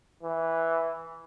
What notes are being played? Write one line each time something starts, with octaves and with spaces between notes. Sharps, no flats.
E3